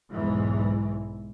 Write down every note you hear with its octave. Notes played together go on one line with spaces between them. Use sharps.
B1 E2 G#2 E3